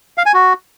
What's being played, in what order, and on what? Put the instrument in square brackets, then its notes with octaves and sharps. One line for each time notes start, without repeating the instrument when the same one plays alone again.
[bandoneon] F5
G#5
F#4